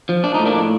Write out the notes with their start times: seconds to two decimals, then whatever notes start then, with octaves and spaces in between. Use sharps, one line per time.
0.09 F3
0.24 D4
0.34 A2 D#4
0.46 A#3 D4